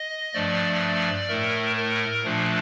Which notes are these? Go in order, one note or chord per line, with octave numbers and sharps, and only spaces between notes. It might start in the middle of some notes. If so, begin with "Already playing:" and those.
Already playing: D#5
G2 F3 A3 D5
A2 A3 A#4
A#4
A#2 F3 A3 D4